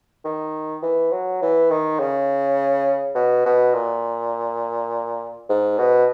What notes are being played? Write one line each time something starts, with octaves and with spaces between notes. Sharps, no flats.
D#3
E3
F#3
E3
D#3
C#3
B2
B2
A#2
G#2
B2